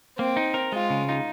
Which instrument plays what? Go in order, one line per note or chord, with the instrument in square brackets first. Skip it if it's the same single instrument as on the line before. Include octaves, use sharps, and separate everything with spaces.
[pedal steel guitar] A#3 [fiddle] C4
[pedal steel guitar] D#4
A#4
[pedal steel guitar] G#3 [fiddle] F4
[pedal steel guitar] C#3
D#4